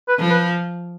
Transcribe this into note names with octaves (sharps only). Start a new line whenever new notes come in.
B4
F3
B4